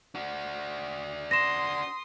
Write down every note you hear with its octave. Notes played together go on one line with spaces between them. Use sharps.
D4 F#4
C6 D#6 A#6 E7